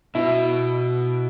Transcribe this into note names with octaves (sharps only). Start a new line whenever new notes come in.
B2 E4